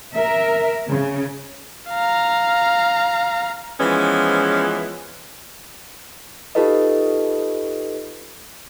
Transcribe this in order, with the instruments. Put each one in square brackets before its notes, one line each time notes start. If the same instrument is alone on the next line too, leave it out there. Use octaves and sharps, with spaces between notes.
[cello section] A#4 E5
C#3
[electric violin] F5 A#5
[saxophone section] E3 F3 G#3 B3 C#4
[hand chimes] D#4 F4 G4 A4 B4 D#5